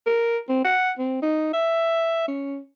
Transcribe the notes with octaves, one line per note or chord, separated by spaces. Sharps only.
A#4
C4
F#5
C4
D#4
E5
C#4